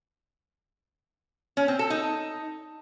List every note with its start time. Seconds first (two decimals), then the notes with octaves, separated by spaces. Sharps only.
1.57 C#4
1.68 C4
1.79 A4
1.90 D#4